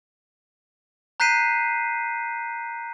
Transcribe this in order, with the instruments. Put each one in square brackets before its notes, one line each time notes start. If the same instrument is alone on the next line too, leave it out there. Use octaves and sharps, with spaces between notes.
[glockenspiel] A#5 F#6 G6 B6 C7 D#7